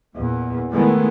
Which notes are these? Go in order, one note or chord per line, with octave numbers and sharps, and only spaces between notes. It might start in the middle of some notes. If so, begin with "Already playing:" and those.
E2 A#2
D#3 E3 G#3 A3 B3